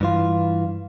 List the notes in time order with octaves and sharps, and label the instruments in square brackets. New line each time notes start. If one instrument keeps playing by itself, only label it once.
[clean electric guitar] G2 E3 F4